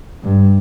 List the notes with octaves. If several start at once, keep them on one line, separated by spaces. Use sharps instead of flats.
G2